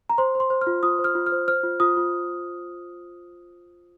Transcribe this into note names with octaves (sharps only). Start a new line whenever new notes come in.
A#5
C5 C6
C5
C6
C5
F6
F4
F4 D#6
C5
F6
F4
F6
C5
C5 F6
F4
F4 D#6
F4